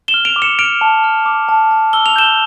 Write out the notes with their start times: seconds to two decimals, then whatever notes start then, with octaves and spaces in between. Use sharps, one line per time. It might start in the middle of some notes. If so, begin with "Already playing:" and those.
0.08 E7 G7
0.14 F6
0.25 D7 F7
0.36 D6
0.42 C#7 E7
0.59 F6 D7 F7
0.81 A5
1.04 F6
1.26 D6
1.49 A5
1.71 A5
1.93 E6 G7
2.06 F7
2.16 G6 E7 G7